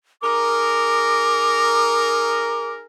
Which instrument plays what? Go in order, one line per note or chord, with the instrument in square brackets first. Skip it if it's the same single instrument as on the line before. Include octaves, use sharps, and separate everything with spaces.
[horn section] D#4 G#4 A#4 [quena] D6